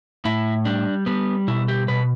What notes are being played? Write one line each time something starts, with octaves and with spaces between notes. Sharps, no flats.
A2 E4
G3 D4
G3 B3
B2 E4
G4
B2 B4